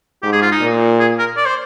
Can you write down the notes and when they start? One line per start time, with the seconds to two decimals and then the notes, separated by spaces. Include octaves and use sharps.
0.22 G#2 G4
0.33 G#4
0.42 F4
0.52 D#4
0.61 A#2
1.00 G#4
1.19 A#4
1.37 D5
1.46 C5